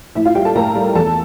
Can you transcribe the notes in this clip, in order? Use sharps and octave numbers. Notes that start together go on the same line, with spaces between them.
A2 E4 E5
F4 F5
G3 G4 G5
A4 A5
A2 A#4 A#5
G3
E2 A4 A5